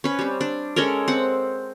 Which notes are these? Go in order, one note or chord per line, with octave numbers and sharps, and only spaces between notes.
C#4 B4
G3 C4
D4
G#3 C#4 A4 A#4
C4 F#5